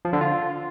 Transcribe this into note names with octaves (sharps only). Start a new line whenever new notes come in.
F3
D3
F4